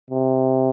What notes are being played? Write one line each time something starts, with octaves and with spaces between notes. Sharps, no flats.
C3